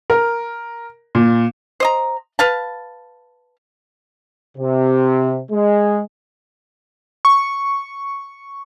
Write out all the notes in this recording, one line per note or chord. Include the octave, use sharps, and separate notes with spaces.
A#4
A#2
C5 D#5 A#5
B4 F5 A5
C3
G#3
C#6